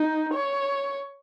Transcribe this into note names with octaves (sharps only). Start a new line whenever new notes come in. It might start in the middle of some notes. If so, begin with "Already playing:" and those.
Already playing: D#4
C#5